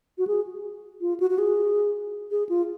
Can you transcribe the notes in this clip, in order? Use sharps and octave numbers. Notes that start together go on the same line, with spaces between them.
F#4
G#4
F4
F#4
F#4
G#4
G#4
F4